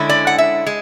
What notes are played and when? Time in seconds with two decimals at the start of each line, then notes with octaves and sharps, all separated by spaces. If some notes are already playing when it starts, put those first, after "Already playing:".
Already playing: D3 G#3 C#4 E4
0.09 D5
0.27 F#5
0.38 E5
0.66 G#3